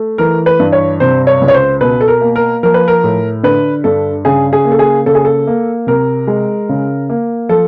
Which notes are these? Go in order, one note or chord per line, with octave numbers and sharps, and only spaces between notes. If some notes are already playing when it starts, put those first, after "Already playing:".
Already playing: A3
E3 A#4
B4
G2
C#5
C3 C5
C#5
C#2
C#5
C5
B2 B4
A4
A#4
A#3
A#4
F3 A#4
B4
A#4
A2
D3 B4
G2 A4
C#3 G#4
G#4
A#3
A4
G#4
C#3 A4
G#4
A4
A#3
C3 A#4
G#3
C#3
A#3
F3 A4